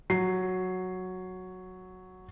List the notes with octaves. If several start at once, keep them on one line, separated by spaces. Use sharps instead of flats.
F#3 C7